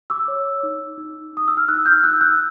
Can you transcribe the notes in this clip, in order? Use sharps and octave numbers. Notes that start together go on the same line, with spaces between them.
D6 E6
C#5
D#4
D#4
D#4 D#6
E6
F6
D#4 E6 F#6
F6 G6
D#4 E6 F#6
E6 F#6